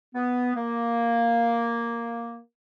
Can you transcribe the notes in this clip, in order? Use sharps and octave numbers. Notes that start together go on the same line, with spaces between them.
B3
A#3